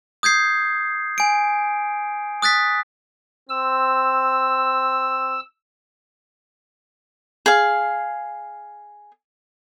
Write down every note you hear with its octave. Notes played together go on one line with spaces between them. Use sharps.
D#6 G6 G#6 C7
G#5 D7
D#6 F#6 A6 B6
C4 E6
G#4 F5